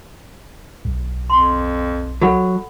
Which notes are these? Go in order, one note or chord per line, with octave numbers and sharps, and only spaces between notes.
B1
F2 C6
F#3 A4 F#5 B5